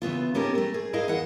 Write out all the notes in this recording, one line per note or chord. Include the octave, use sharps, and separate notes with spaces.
C#3 E3 B3 F4
B3 C#4 D#4 G4 A4 A#4
A3 A#4
G#4
E4 G#4 A#4 B4 D#5 F5
E2 F#5